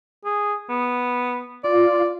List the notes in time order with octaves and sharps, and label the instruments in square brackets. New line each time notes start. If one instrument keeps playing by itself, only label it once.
[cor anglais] G#4
B3
[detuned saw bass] F4 [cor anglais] D5